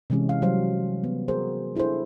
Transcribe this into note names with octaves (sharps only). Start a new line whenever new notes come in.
C3 E3 G#3 C#4 G4
F5
F#3 G3 C5 F5
B3
F#4 G#4 A#4 C5
D4 E4 G#4 A4 C5